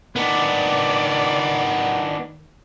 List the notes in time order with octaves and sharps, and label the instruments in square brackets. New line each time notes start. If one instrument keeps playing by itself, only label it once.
[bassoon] D#3 [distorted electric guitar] B3 D4 [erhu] D5